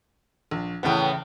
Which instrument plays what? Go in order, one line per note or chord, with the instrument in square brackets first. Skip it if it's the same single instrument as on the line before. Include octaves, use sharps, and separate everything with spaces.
[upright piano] A#1
[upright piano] E2 C#3 G5 [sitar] A2 B3